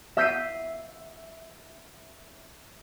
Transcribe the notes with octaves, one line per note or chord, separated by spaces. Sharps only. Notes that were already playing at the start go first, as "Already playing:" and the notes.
E5 E6 G6 B6 C7 D#7